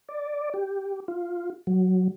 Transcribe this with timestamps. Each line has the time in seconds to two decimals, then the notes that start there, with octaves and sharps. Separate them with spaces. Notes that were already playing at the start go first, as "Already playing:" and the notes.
0.09 D5
0.54 G4
1.08 F4
1.67 F#3